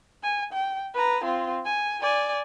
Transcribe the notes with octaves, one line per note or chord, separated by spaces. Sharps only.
G#5
G5
B4 A#5
C4 F4
G#5
D5 G#5